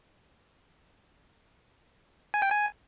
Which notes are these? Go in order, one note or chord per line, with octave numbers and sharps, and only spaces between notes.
G#5
G5
G#5